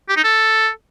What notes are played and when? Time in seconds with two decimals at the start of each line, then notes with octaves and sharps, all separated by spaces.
0.09 G4
0.17 D#4
0.24 A4